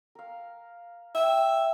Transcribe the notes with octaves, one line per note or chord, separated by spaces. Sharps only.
A#4 F5
E5 G5